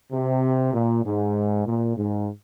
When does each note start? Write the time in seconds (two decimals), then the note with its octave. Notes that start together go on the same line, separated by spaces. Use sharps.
0.11 C3
0.73 A#2
1.03 G#2
1.66 A#2
1.96 G#2